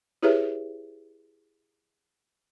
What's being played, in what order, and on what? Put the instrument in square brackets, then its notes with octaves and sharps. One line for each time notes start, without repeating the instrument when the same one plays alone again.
[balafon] E4 G4 G#4 B4 C#5 E5